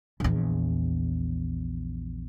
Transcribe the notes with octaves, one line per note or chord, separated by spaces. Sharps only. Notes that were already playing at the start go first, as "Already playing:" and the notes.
A#1 E2